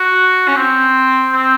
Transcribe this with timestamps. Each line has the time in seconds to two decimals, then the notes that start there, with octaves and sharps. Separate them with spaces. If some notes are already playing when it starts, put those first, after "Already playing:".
Already playing: F#4
0.48 C#4
0.56 C4
1.33 C4